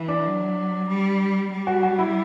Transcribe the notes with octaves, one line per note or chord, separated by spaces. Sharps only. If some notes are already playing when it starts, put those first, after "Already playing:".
Already playing: E3
D4
F#3
G3
G3
F#4
F#4
E4